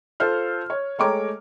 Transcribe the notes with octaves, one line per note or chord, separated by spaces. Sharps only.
F4 A4 C5 F6
C#5
G#3 A3 C#5 G5 A#5 D6